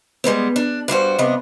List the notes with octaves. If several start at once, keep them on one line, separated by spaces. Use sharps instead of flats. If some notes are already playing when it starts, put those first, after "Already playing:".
G3 G#3 B3 C4
D4
G2 G3 F#4 C5
G2 C3 B3 D4 D#5